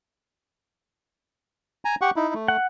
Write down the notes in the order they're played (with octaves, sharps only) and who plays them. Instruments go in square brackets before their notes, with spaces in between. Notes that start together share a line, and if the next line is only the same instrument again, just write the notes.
[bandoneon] G#5 A#5
G4 F#5 C#6
D#4 E4
A3
[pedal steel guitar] F#5